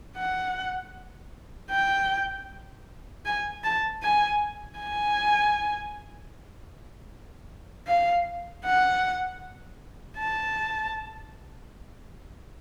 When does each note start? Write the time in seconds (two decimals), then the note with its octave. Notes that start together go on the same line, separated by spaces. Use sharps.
0.17 F#5
1.71 G5
3.25 G#5
3.64 A5
4.02 G#5
4.79 G#5
7.87 F5
8.65 F#5
10.19 A5